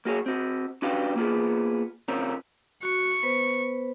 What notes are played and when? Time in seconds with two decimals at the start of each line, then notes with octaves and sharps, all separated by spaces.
0.05 A#3 F#4 G#4 C#5
0.26 C4 F#4
0.82 C#4 D4 F#4 G4 B4 F5
1.16 A#3 B3 F4 G#4
2.08 C#3 C4 C#4 F4 A#4
2.83 F#4 C#6
3.23 B3 B4 C5